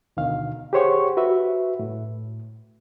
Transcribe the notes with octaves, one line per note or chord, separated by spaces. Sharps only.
D2 B2 D3 D#3 F5
G4 G#4 C5 C#5 F#5 C#6
F#4 B4 E5
A2